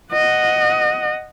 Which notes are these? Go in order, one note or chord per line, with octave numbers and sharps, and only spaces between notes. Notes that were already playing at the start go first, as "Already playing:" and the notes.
D#5 F#5